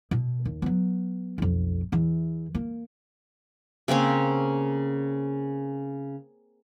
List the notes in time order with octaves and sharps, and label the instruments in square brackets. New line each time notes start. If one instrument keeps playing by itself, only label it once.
[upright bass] B2
D#2
F#3 B3
B1 F2
E2 E3
A#3
[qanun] C#3 A#3 C4 C#4